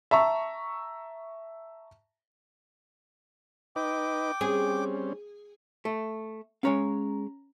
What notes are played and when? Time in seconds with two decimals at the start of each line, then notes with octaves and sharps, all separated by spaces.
0.11 E5 A5 A#5 C#6
3.76 D#4 B4 D#5 G5 D6
4.41 G3 C4 C#4 G#4
5.85 A3
6.63 G#3 C#4 C#5 F5 A#5